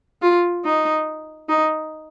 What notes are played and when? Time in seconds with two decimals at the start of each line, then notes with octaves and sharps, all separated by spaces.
0.22 F4
0.64 D#4
1.49 D#4